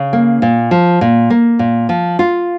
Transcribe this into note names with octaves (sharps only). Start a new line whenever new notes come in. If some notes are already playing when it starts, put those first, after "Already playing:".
Already playing: C#3
A#3
A#2
F3
A#2
A#3
A#2
F3
F4